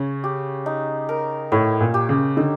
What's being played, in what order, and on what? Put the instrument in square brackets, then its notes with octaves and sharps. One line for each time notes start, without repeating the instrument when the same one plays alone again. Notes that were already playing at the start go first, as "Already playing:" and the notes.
Already playing: [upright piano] C#3 [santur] C#5
[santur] G4
D#4
A#4
[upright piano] A2 [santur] C#5
[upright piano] A#2
[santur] G4
[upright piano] C#3
[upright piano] D3 [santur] D#4